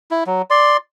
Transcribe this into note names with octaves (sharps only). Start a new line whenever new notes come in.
E4
F#3
D5 C6